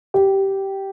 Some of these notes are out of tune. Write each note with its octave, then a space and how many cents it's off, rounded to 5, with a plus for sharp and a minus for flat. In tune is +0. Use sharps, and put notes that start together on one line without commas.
G4 -10